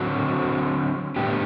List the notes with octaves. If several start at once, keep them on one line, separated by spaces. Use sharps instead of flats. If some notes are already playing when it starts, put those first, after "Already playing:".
Already playing: D3 F#3 C4 F#4 C5
A2 G3 B3 D4 G4